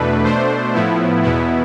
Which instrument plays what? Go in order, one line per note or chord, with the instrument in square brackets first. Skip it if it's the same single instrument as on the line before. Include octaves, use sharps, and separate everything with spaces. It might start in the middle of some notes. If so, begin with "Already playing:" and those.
Already playing: [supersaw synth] E2 B2 A3 D4 B4
B2 A3 D4 C5
A2 F3 B3 E4
E2 B2 B3 E4